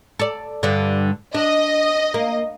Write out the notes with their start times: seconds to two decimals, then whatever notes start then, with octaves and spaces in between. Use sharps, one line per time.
0.19 A4 D5
0.63 G2 D3
1.34 D4 D#5
2.14 A#3